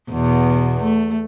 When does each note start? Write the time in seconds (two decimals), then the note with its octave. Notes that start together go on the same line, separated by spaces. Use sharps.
0.11 E2 B2
0.83 A3